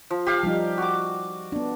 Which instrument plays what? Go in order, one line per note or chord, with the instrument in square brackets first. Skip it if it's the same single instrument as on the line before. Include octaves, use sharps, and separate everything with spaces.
[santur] F3
G4 F5
[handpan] F3 G3 D#4
[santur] F#4 D6
[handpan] B3 D4